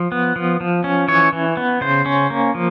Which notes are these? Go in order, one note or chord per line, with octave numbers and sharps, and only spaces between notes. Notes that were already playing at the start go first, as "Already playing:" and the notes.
Already playing: F3
B3
F3
F3
C#4
E3 C#5
E3
B3
C#3 C5
C#4
A#3
F3